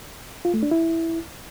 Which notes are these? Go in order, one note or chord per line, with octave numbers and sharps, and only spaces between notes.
F4
A3
D4
E4